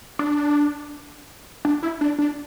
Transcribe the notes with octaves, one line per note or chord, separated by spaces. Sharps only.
D4
D4
E4
D4
D4